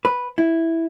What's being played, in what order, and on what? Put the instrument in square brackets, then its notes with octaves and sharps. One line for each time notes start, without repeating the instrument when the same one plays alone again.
[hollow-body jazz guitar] B4
E4